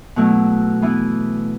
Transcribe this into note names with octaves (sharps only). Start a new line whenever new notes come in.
B2 F#3 A3 E4
E3 B3 E4